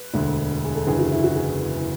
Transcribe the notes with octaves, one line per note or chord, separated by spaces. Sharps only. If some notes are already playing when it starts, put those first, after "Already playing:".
Already playing: B4
E1 D2 D3
G#4
A4
F#1 E2 D3 G#4
F#4
E4
F#4
G#4